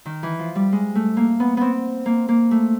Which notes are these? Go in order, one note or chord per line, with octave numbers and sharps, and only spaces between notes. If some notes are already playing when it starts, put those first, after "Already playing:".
D#3
E3
F3
G3
G#3
A3
A#3
B3
B3 C4
A#3
A#3
A3